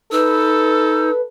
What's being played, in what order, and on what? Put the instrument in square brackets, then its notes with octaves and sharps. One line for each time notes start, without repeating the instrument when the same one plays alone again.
[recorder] D#4 [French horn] A4 [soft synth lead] B4 [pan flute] E6